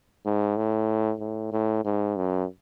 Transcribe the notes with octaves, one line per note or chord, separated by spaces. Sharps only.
G#2
A2
A2
A2
G#2
F#2